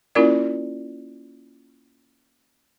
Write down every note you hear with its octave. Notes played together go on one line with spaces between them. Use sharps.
A#3 C#4 E4 F4 A#4 D5